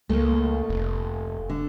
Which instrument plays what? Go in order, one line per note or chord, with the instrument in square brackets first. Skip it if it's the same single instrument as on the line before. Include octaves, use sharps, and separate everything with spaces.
[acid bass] C#2 [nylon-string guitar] A3 A#3
[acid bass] F1
[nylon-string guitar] D3